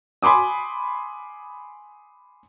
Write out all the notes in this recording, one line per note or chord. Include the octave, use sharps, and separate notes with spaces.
G#5 B5 C6 D6 D#6